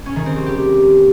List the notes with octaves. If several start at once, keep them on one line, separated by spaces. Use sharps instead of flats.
C#4
D#3
C4
G3
G4